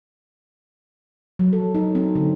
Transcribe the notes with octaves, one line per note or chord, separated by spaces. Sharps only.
F#3
A4
D#4
C4
D3